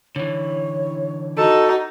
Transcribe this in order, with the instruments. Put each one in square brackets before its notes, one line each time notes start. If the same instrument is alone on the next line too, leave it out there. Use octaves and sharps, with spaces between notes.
[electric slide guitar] D3 E3 [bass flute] C#5
[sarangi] D#4 [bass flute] F#4 [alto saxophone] A4